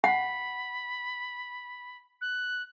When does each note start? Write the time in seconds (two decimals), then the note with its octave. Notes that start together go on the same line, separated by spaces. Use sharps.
0.04 F#5 B5
2.21 F#6